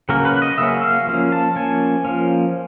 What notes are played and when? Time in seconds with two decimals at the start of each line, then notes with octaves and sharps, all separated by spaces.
0.09 C#3 F#3 A#3 C#4 A#4
0.25 B4
0.42 D#5
0.58 C#3 F#3 A#3 C#4 E5
0.83 F5
1.07 F3 A#3 C#4
1.32 A5
1.56 F3 A#3 C#4 G#5
2.05 F3 A#3 C#4